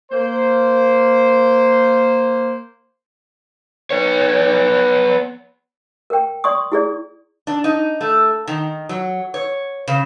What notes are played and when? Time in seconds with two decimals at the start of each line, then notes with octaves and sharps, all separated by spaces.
0.12 A#3 C5
3.91 B3 C#5
6.10 A#4 G5
6.44 D5 C6 C#6 D#6
6.72 E4 G#4 D5
7.47 D4
7.64 D#4
8.01 A3
8.48 D#3
8.89 F#3
9.34 C#5
9.88 C#3